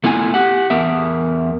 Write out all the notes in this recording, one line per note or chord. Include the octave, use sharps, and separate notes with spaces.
A3 B3 E4 F4 G#5
G4 F#5
E2 B3 A#4 E5